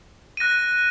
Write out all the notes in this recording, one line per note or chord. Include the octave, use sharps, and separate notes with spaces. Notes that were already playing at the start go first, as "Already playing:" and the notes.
F#6 A#6 D#7